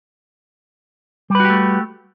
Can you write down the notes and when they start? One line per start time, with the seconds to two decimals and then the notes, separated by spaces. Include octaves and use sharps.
1.30 G3
1.35 B4
1.40 F#4
1.45 G4
1.50 A3